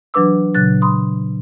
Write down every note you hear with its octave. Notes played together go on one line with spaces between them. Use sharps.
E3 F#3 D4 B4 D6 E6
A#2 C#3 F#3 F#6 A6
B5 C6 D#6